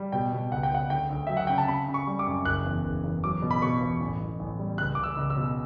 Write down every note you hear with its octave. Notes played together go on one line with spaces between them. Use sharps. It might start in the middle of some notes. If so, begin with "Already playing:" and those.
Already playing: G3
B2 G5
B2
C#2 F#5
G5
C#2 F#5
D2 G5
D2
F#3 E5
F#5
C#3 G5
A5
C#3 B5
C#3
C#6
G3
D6
F#2
F#1 F#6
E2
F#1
E2
F#3 D6
B2
B5
B2 C#6
E2
A1
A1
A1
G3
C#2 F#6
C#2 D6
E6
C#2
E6
B2